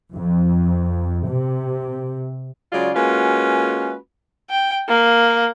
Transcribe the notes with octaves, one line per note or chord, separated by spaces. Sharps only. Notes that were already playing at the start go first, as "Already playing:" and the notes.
F2
C3
C#3 F#3 G#3 F4 D5
G#3 A#3 C#4 F4 F#4 B4
G5
A#3